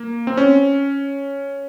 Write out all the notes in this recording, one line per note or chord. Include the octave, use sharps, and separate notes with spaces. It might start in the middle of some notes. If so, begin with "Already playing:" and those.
Already playing: A#3
C4
C#4